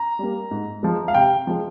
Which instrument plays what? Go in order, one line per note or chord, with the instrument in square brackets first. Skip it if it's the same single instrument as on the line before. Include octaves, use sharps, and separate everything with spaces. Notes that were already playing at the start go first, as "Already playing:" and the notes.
Already playing: [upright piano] A#5
G3 A#3
G#2
F3 G#3
F5
C3 G5
F3 G#3